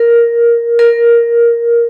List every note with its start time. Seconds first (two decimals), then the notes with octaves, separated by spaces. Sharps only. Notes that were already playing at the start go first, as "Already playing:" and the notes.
Already playing: A#4
0.79 A#4